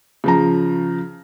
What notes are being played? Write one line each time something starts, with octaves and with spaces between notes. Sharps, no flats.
C#3 F3 A#5